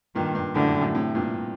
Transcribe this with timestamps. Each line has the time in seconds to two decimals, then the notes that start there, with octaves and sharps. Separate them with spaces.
0.15 G2 A#2 D#3
0.35 G2
0.55 F#2 A2 D3
0.68 G2
0.81 F#2 A2
0.95 A2 C3
1.15 G2 A#2